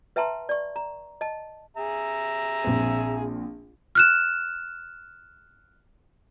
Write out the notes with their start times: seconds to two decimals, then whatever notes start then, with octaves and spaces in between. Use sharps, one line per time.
0.16 B4 E5 G5 A5 A#5 C6
0.49 D5 C#6
0.76 A#5
1.21 D#5 A5
1.77 G#4 E5 A#5
2.64 A#1 C4
3.95 F6 F#6 E7